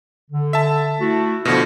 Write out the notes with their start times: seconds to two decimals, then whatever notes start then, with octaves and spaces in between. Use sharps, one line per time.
0.31 D3
0.53 E5 A5
1.01 A3 E4 F#4
1.45 B2 D3 F3 A3 C#6